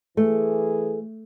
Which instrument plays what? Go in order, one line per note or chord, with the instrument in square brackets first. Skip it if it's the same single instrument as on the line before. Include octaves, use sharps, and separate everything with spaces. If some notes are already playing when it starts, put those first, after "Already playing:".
[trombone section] E3 G#4 [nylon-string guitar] A3